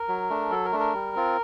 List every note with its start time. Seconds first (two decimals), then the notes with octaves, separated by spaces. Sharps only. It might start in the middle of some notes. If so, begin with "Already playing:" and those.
Already playing: A#4
0.08 F#3
0.30 A3 D4
0.51 F#3 A4
0.65 A#4
0.72 A3 D4
0.80 A#4
0.94 G3
1.16 C4 F4